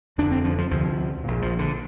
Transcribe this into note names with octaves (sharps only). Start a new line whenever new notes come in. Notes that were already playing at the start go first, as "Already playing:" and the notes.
F1 F2 D3 D4
C4
F3
F3
D2 C3 F3
A#1 A#2
F3
D3